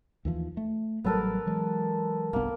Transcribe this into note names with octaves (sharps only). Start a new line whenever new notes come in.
D#2 E3 F3
A3
A1 F#3 G3 B3 A4 A#4
E3 F#3 G#3
G1 C2 A#3 B3